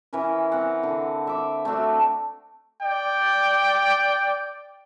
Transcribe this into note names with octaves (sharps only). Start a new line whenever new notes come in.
E3 C#4 A#4 B4
C4 F#5
D3
E5 D6
A3 C4 D4 F#4
D5 G5